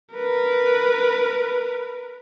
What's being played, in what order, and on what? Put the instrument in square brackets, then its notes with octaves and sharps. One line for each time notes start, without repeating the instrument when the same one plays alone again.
[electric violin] A#4 B4